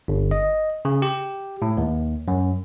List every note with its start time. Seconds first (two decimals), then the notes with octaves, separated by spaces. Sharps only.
0.08 G1
0.31 D#5
0.85 C#3
1.02 G4
1.62 A2
1.77 D#2
2.28 F#2